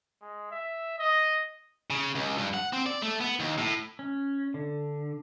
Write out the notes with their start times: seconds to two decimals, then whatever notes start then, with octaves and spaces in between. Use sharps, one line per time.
0.21 G#3
0.51 E5
0.98 D#5
1.90 C#3
2.15 C#2
2.38 G2
2.54 F#5
2.73 C4
2.86 D5
3.02 A3
3.21 B3
3.40 D#2
3.58 A2
3.99 C#4
4.54 D3